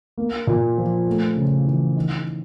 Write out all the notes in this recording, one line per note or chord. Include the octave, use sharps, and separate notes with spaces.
A#3
A#2
F3
A3
C#3
E3
D#3